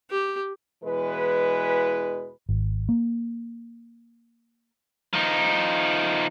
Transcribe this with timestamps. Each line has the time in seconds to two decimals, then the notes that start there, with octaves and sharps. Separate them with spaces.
0.11 G4
0.83 E2 B2 E3 G#3 B4
2.49 G#1
2.89 A#3
5.13 F3 D#4